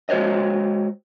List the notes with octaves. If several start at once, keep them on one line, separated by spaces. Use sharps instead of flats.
G#3 F#4 C5 C#5 D#5